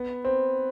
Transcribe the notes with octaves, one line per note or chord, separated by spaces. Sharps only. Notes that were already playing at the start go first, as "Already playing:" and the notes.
Already playing: B3
C4